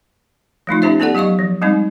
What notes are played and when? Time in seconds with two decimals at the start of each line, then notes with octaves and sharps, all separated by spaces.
0.67 F3 A3 D#4 F4
0.82 C#4 D#4 G4 C5 E5
1.00 B3 G4 A4 D5 F#5
1.15 F#3 G4 D#5 F5 C#6
1.39 F3
1.62 G3 G#3 C4 D#4